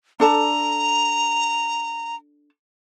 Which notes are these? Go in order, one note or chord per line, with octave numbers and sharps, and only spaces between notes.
D4 A4 A5 A#5